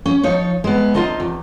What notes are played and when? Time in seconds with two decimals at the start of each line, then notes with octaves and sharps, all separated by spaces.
0.06 C#4
0.23 F3 D#4 C#5
0.64 G#3 B3
0.95 D2 F3 D#4 F4 D#5 A5
1.20 E2